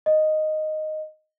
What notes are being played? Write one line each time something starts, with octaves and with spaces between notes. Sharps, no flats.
D#5